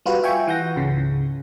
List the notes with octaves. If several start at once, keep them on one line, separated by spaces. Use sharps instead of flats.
G3 F4 F#4 B4
F4 E5 G5 G#5 C#6
E3 F#5 G6 A#6
C#2 G#2 C#3